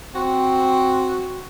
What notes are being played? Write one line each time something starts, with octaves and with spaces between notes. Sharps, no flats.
C4 F#4